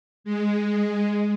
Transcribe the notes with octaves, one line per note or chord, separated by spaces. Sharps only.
G#3